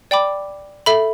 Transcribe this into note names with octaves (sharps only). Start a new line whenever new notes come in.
D5 G5 B5 D6
A4 E5 B5